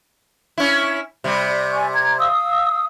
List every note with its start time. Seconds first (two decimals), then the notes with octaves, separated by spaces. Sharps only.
0.58 C#4 E4
1.24 C3 G3
1.71 D5 G#5 C#6
1.93 A#5 G#6
2.19 F5 D#6 E6